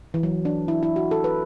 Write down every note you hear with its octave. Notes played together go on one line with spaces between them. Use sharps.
E3
F#3
D4
E4
E4
F#4
A4
B4